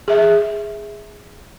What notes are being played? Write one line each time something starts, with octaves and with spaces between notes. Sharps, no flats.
G#4 E5